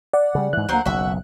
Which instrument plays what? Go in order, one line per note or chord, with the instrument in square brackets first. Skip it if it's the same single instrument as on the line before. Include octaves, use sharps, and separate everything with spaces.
[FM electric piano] D5 F#5
[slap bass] C#3 G3
[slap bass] G#2 E3 [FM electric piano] F#6
[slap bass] D2 A#3 [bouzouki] F#3 A#4 C5
[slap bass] F#1 B1 [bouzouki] F#4 E5